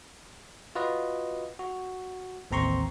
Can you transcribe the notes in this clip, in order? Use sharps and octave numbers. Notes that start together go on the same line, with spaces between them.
F4 F#4 B4 D#5
F#4
A1 D#2 C4 A#5 C6 C#6